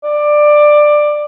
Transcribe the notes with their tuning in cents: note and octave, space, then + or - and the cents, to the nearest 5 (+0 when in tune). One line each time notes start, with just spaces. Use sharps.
D5 +15